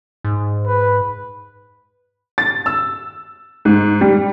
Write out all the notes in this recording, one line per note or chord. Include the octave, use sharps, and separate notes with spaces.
G#2
B4
A6
E6
G#2
G3